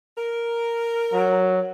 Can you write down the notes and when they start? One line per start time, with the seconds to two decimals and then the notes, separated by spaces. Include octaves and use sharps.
0.18 A#4
1.13 F#3